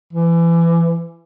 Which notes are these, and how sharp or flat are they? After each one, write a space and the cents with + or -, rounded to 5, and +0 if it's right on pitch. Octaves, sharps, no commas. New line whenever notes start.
E3 +30